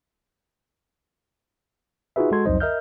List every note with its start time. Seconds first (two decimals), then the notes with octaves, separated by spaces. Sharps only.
2.16 D#4 F4 F#4 G#4 B4 E5
2.32 G#3 F#4 A4 C6 G#6
2.46 C2 F2 F#3 D#4 C5 D#5
2.60 A#4 D#5 E5 F6 G6